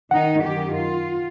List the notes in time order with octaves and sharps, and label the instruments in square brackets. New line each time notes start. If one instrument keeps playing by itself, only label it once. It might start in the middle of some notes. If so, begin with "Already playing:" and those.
[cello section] D#3 D#4 [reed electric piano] F#5
[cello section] F#2 D#3 G4
F4